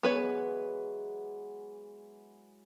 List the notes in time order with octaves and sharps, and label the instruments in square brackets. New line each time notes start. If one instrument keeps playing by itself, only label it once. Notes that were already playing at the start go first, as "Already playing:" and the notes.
[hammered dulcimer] E3 F#3 G#3 [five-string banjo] B3 B4 C#5